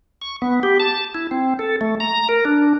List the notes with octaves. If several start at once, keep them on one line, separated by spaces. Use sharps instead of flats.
C#6
B3
G4
A5
E4
C4
A4
A3
A#5
A#4
D4